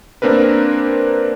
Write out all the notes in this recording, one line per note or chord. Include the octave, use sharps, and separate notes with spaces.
A#3 C4 D4 A#4 B4